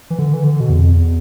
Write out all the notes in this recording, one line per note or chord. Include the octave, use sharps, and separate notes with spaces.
E3
D3
E3
D3
B2
E2
F2
E2